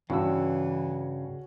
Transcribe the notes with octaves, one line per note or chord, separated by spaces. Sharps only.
G2 C#3 E3 C#4 F#4 E6